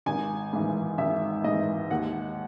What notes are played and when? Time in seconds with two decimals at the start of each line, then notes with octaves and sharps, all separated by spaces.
0.06 G#1 G#5
0.53 G#2 E3
0.98 G#1 E5
1.44 G#2 E3 D#5
1.91 D#2 F#5